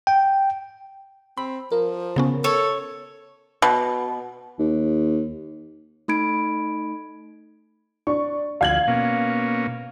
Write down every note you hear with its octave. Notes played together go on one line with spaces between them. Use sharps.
G5
C4 B5
F3 A#4
C#3 B3 C#4
A4 C#5
B2
D#2
A3 D#4 B5 G#6 D7
D4 C#6
D2 F3 F5 G#6 F#7
B2 A#3 C#4